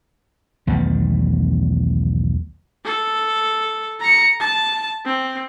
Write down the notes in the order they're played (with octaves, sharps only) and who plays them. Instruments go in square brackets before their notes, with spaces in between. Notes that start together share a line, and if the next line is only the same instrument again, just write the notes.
[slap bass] B1 E2 D#3 A3
[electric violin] A4
A#5 C#7
A5
C4